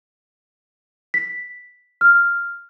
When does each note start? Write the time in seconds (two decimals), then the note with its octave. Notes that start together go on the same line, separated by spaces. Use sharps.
1.14 B6
2.01 F6